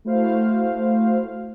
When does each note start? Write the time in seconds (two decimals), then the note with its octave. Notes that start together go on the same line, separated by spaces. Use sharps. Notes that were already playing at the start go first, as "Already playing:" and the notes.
0.05 A3 E4 F#4 C5 F5